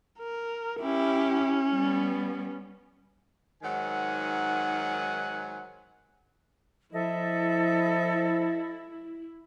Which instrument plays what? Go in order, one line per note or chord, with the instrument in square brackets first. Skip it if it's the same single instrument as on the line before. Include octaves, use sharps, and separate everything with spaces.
[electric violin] A#4
[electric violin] C#4 [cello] E4 G4
[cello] G3 B3
[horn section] G#2 D#3 F#3 F#5 G#5
[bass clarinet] F3 [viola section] E4 [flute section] A4 D#5 E5